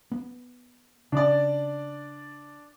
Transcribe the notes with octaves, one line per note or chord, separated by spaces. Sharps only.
B3
C#3 C#4 D4 D5